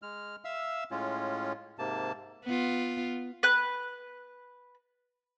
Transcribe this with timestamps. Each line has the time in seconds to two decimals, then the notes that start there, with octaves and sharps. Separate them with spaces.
0.02 G#3 F6
0.45 E5 F5 E6
0.91 A2 G#3 C#4 F4
1.79 G#2 C3 A#3 A5
2.45 B3 F4
3.43 B4 F#6